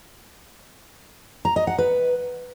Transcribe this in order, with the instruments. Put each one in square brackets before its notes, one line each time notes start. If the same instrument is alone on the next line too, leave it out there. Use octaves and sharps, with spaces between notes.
[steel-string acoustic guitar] A#5
D#5
F#5
B4